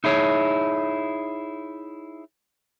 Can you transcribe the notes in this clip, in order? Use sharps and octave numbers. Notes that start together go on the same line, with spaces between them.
D#4 E4 G#4 C#5